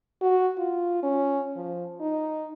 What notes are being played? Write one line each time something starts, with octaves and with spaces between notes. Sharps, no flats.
F#4
F4
C#4
F3
D#4